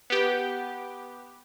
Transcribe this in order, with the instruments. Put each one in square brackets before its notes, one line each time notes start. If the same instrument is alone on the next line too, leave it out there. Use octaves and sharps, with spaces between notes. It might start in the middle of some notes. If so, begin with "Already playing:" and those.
[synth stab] B3 G4